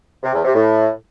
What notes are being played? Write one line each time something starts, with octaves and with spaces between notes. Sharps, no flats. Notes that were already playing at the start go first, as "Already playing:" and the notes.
C3
E2
C3
A2